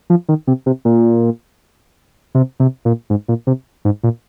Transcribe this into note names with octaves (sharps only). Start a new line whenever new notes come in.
F3
D#3
C3
C3
A#2
C3
C3
A#2
G#2
A#2
C3
G#2
A#2